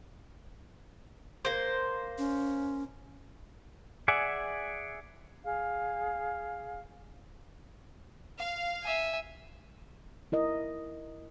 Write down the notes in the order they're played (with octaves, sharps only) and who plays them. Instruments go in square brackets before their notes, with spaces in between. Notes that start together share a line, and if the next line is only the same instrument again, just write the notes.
[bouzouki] A#3 C5
[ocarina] C#4
[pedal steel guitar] G#4 D5 E5 F#5 G#5
[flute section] G#4 F5
[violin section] F5
[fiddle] E5 G#5
[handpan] E4 A#4 D#5